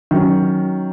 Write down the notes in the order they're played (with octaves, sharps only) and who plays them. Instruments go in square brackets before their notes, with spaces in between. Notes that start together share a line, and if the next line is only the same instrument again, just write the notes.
[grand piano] D#3 F#3 C#4